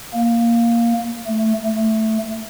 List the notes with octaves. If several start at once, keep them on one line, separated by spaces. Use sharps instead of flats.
A#3
A3
A3